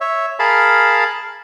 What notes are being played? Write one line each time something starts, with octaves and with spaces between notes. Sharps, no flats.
C#5 E5
G#4 A#4 F5 A5 B5